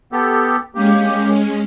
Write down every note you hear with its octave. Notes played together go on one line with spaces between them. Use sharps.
B3 G4 A4
G#3 A#3 C#4 G4